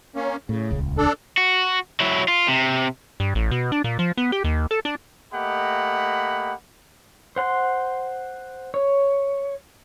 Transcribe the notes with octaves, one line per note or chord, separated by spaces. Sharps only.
A#3 C#4
A2 C#3
D#1 C#2
D4 A4
F#4
F#3 E4
F4
C3
G2
A1
B2
D4
A#2
F3
B3
G4
D#2
A4
D4
A3 A#3 G4 D#5 F#5 B5
C5 F#5 C6
C#5